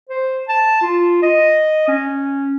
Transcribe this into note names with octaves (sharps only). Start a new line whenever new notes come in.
C5
A5
F4
D#5
C#4